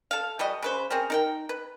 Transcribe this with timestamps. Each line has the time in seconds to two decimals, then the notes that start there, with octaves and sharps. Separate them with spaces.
0.11 A4 F5
0.39 E3 G3 F#4 D#5
0.62 C#3 B4 C5
0.90 C4 C#4 G#4 A#4
1.10 D#4 A#4 G5
1.49 B4